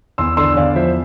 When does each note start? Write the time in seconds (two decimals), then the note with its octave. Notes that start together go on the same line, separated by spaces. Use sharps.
0.18 E2 C6 E6
0.37 D3 C6 E6
0.56 E2 D5 F5
0.76 F3 C5 E5